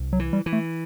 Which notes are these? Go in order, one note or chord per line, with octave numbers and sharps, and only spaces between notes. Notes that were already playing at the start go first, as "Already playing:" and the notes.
Already playing: C2
F#3
E3
G3
E3
A3